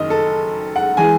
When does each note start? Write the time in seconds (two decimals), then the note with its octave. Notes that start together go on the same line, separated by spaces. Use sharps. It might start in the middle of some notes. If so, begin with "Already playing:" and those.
Already playing: F#1 F#2 D#3 D#5
0.10 A4
0.76 F#5
0.97 E3 G#3 G#5